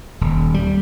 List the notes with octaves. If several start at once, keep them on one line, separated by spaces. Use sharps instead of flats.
D#1
G3